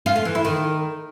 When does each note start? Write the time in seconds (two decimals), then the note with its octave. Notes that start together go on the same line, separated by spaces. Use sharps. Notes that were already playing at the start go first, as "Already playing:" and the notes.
0.06 F4
0.16 A3
0.25 E3
0.35 E4
0.45 D#3